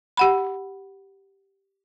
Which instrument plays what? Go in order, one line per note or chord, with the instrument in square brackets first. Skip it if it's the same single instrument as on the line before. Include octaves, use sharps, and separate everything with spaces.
[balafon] G4 F#5 B5